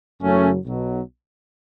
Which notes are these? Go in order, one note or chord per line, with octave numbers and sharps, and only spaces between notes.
F#1 F#2 C#3 F#3 A3 C#4
B1 B2 F#3